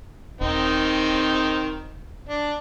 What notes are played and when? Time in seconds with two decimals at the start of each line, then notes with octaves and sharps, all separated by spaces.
0.41 D#1 D#3 C4 D#4
2.29 D4